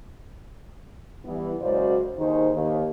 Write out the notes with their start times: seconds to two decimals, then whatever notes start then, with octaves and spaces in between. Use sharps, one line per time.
1.24 E3 G3 B3 E4
1.61 F#2 C#3 G#3 F#4 C5 D5
2.17 D#2 D#3 D#4 G#4 C5
2.54 D#2